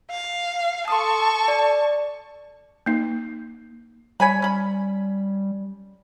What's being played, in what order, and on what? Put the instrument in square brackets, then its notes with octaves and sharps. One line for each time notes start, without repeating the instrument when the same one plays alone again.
[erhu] F5
[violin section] A4 C#6 [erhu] A5 [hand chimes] C6 D#6
[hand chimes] D5
[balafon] A#3 D#4
[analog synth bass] G3 [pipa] C#5 G#5 B5
[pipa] C#4 B5